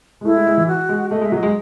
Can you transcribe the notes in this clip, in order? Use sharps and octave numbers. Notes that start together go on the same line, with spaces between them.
G#3
A3 E4
G#3
G#3
E3
F#4
G#3
A3 D#5
G#3 E5
F#3 D#5
G#3